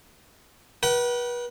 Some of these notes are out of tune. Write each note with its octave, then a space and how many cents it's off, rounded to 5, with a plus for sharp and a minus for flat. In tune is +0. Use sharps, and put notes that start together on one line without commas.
B4 -35 F#5 +40